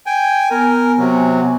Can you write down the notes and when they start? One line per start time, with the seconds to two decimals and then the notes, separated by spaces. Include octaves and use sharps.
0.06 G5 G#5
0.51 B3 A#4 G#5
0.98 C3 F#3